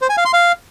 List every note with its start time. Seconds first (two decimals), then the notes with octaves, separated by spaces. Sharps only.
0.02 C5
0.10 G#5
0.17 F5
0.25 C6
0.33 F5